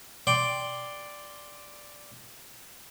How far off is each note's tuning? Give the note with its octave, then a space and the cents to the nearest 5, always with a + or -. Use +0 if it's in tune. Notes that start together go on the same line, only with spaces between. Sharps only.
D5 +0 G5 +0 C6 +0